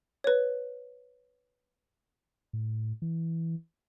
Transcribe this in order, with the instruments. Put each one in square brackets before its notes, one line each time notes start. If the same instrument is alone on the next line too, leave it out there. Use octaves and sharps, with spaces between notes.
[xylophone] B4 C#5
[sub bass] A2
E3